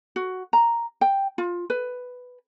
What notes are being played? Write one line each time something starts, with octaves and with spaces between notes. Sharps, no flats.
F#4
A#5
G5
F4
B4